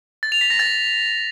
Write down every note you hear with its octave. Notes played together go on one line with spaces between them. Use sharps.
A6
F7
B6
A#6
A6